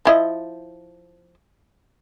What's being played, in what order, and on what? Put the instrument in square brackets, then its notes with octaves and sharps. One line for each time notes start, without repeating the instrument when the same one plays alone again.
[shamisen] F3 E4 D#5